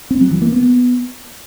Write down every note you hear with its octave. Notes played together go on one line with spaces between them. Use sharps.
C4
F#3
E3
A#3
B3